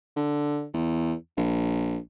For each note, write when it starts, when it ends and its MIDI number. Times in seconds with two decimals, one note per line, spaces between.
0.16 0.65 50
0.73 1.14 40
1.37 1.98 34